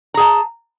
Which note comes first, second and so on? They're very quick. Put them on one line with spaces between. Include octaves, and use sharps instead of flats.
A#5 G#4 A5